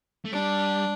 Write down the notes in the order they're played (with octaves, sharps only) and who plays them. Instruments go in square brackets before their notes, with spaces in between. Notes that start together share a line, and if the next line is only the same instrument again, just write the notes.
[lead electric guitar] A3
[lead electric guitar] G3 [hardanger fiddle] D4